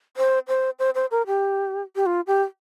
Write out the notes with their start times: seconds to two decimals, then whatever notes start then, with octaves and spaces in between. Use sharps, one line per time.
0.17 C5
0.48 C5
0.79 C5
0.95 C5
1.11 A#4
1.27 G4
1.96 G4
2.06 F4
2.27 G4